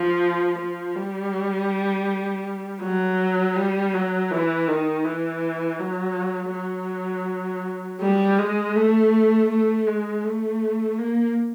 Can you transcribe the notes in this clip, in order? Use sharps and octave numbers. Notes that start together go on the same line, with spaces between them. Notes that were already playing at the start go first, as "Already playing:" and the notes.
Already playing: F3
F3
G3
F#3
G3
F#3
E3
D#3
E3
F#3
F#3
G3
G#3
A3
A3
G#3
A3
A#3